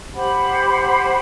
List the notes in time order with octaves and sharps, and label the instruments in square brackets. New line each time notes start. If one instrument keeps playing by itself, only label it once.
[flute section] G4 C5 F#5 B5